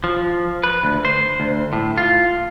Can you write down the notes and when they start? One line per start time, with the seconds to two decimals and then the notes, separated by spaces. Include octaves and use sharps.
0.04 F3
0.64 B4
0.84 D2
1.05 C5
1.40 D2
1.73 A2
1.98 F4